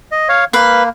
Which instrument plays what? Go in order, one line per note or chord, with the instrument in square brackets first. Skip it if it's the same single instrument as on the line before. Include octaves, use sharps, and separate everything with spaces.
[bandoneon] D#5
C#5 F5
[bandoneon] A#3 [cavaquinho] B4 F5